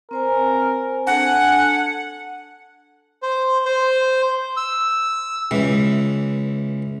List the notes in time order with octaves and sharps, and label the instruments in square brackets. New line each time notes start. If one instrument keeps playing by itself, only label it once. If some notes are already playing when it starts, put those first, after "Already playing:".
[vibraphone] C4 C5 G#5 [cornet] A#4
[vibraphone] D4 A4 A5 [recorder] F#5 [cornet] G#5
[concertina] C5
C5
E6
[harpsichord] C#2 E3